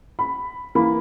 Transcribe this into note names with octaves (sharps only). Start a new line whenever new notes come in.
B5
E3 A#3 B5